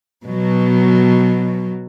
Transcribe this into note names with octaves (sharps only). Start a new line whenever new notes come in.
B2 F#3